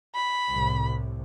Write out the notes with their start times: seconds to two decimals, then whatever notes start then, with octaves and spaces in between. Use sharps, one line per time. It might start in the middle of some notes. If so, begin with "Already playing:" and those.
0.15 B5
0.51 C2 A2 C3